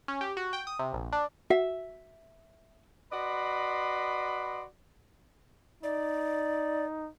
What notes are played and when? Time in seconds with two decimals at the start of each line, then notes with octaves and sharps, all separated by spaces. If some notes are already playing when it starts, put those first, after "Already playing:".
0.08 C#4
0.21 G4
0.37 F#4
0.53 G5
0.67 D#6
0.79 C3
0.93 A#1
1.13 D4
1.50 F#4 E5
3.12 F#4 B4 D5 D#5 B5 C6
5.83 D#4 D5